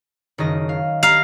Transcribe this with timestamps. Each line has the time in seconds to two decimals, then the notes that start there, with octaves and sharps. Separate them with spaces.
0.38 F#1 D#3 D#5
0.69 F5
1.03 G3 F5 A#5 B5